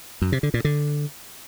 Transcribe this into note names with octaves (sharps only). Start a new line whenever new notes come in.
F#2
C3
D3
A#2
D3